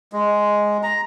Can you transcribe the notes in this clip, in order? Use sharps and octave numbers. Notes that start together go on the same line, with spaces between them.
G#3
A#5